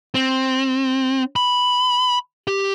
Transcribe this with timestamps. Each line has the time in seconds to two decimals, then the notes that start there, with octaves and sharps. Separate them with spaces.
0.14 C4
1.36 B5
2.48 G4